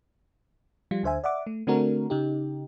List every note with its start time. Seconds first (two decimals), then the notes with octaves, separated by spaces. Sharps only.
0.91 F3 G3 F4
1.03 D2 D3 C5 E5 G#5
1.24 D5 E5 F#5 D6
1.47 A3
1.67 D3 A3 C4 D4 F#4 A#4
2.10 C#3 D#4 G4